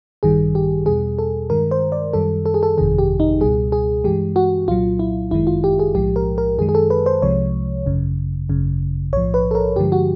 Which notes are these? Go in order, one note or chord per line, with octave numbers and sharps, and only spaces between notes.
A1 G2 D#3 G3 G#4
G4
E2 B2 G3 G#4
A4
G2 D#3 G#3 A#4
C5
D5
F#2 D#3 G3 A4
A4
G#4
A4
G1 F2 C3 D#3 G#4
G4
D#4
C#2 B2 G3 G#4
G#4
G2 E3 G#3 G4
F#4
C2 A#2 F#3 F4
E4
G1 F#2 D#3 G#3 E4
F4
G4
G#4
B1 A2 F3 G#3 G4
A#4
A#4
F#2 D#3 G#3 G#4
G#4
A4
B4
C5
C2 C3 F3 G#3 C#5
G#1 F#2 C#3
G#1 F#2 C#3
B1 A2 F3 C#5
B4
A4
A#4
G2 D3 F3 G#3 G4
F#4